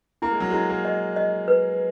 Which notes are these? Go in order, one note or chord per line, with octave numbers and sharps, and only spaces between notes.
A#3 E4
G#3
F#3
G#3 E4
A#3
D#5
D#5
B4